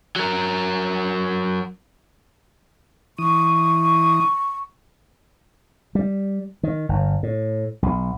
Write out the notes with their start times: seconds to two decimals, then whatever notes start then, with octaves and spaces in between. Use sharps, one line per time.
0.16 F#3 A#4
3.18 E3 C#6 D#6
5.95 G3
6.63 D#3
6.89 G1
7.23 A2
7.82 B1